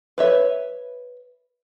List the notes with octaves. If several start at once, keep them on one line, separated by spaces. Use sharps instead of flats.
B4 C#5 E5